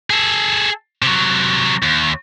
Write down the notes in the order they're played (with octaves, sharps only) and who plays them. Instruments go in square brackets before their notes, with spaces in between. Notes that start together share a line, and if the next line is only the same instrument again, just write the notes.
[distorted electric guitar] G#4 A4
C3 F#3
D#2